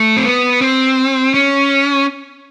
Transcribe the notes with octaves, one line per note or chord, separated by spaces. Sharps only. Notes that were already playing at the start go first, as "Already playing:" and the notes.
Already playing: A3
C4
B3
C4
C#4